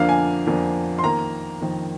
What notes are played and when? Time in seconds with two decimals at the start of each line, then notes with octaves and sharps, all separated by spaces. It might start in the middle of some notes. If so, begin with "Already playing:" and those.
Already playing: F2 D3 F3 A#3 D4 F5
0.09 G#5
0.46 F2 D3 F3 A#3 D4
0.99 C6
1.03 F2 D#3 A#3 A#5
1.61 F2 D#3 A#3